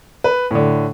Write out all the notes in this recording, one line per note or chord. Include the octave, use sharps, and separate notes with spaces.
B4
A2 D3